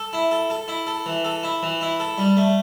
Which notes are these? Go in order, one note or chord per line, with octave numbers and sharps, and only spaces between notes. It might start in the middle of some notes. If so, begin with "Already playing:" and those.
Already playing: A4
E4
A4
A4
E4
A4
E3
A4
E4
E3
E4
A4
G3
A3